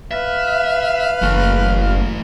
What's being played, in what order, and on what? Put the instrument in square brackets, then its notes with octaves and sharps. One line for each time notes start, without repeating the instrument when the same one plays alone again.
[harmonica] B4 F5 [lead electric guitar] E5
[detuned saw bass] F#1 [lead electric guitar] E3 A3